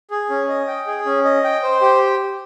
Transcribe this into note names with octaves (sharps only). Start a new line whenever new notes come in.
G#4
C#4
D#5
G5
G#4
C#4
D#5
G5
C5
G4